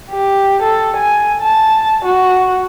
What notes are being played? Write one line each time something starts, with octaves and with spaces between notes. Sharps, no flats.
G4
A4
G#5
A5
F#4